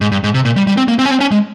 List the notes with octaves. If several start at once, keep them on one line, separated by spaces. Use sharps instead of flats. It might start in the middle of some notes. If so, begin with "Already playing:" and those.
G#2
G2
G#2
C3
A#2
G3
G3
C4
A#3
C4
C#4
C4
C#4
G#3